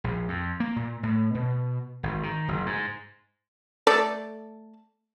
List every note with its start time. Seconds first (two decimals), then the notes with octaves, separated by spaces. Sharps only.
0.04 A#1
0.28 F2
0.60 A#3
0.76 A#2
1.03 A2
1.35 B2
2.03 G#1
2.23 D#3
2.48 F#1
2.66 G#2
3.87 A3 A4 D5